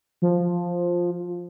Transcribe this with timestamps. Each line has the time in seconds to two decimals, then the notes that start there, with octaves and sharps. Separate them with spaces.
0.22 F3